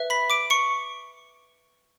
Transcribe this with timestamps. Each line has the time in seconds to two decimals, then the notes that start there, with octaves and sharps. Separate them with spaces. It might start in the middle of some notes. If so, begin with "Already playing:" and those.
Already playing: B4 E5
0.10 B5 B6
0.30 D6 D7
0.50 C#6 C#7